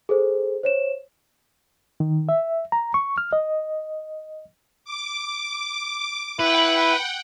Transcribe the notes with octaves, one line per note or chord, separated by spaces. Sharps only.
G#4 A4 C5
C5 C#5 E7
D#3
E5
A#5
C#6
F6
D#5
D6
E4 B4 F#5 G5